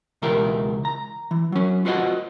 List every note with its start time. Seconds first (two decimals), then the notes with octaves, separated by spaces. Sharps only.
0.22 C#2 B2 E3 G4 A#4 E5
0.85 A#5
1.31 E3
1.52 F#3 C#4
1.85 F4 F#4 C5 D#5 F#5